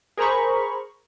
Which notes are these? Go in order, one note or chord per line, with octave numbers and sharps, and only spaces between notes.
G#4 A#4 C5 A#5 B5 C#6